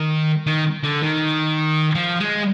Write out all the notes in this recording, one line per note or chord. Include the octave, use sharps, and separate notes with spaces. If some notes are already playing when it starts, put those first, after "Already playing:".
Already playing: D#3
D#3
D3
D#3
F3
G#3